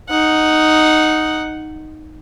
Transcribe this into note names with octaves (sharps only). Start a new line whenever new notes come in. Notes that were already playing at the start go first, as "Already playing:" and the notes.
D#4 F#5